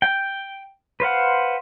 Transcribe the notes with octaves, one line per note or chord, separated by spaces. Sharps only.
G5
B4 C5 F5 F#5